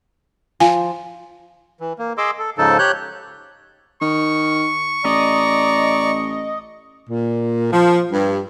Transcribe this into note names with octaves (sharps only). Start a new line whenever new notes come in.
F3 G#5
E3
A#3
G#4 D#5 C6 D6 E6
A4
G#2 C#3 F3 D#4 A4 A5
G4 C#5 F#6 G6
D#3 C#6
A1 D5 D#5 A#5
A#2
F3
G2